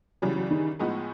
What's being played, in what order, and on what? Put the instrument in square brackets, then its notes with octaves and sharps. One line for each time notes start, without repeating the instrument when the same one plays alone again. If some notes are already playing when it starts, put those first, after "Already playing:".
[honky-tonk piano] C#3 E3 G3 [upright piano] F#3
[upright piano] F#3
D#3
[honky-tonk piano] A2 F3 G#3 B3 D#4